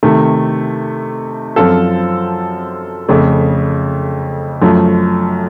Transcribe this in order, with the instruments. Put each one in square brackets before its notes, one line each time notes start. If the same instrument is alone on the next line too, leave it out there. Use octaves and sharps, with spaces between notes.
[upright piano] C3 D#3 A3
F#2 F3 C4 F4 A4
F2 C#3 A3
F#2 F3 A3